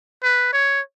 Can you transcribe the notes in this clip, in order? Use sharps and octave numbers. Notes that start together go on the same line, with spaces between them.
B4
C#5